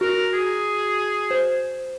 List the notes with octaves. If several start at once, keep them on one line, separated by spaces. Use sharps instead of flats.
F#4 A#4
G#4
C5